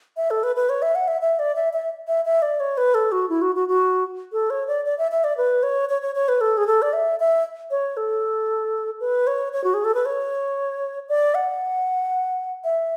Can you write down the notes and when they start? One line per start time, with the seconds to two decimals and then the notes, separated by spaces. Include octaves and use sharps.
0.17 E5
0.31 A4
0.43 B4
0.56 B4
0.69 C#5
0.82 E5
0.95 F#5
1.08 E5
1.21 E5
1.39 D5
1.56 E5
1.73 E5
2.07 E5
2.25 E5
2.42 D5
2.60 C#5
2.78 B4
2.95 A4
3.12 F#4
3.29 E4
3.42 F#4
3.55 F#4
3.69 F#4
4.33 A4
4.50 C#5
4.68 D5
4.85 D5
4.98 E5
5.11 E5
5.24 D5
5.37 B4
5.63 C#5
5.89 C#5
6.02 C#5
6.15 C#5
6.28 B4
6.41 A4
6.57 G#4
6.67 A4
6.82 D5
6.93 E5
7.20 E5
7.71 C#5
7.97 A4
9.00 B4
9.27 C#5
9.53 C#5
9.64 F#4
9.74 G#4
9.84 A4
9.95 B4
10.06 C#5
11.09 D5
11.35 F#5
12.64 E5